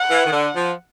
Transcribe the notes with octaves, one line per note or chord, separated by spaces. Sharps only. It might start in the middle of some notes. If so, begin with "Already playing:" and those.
Already playing: F#5
E3
D#3
D3
F3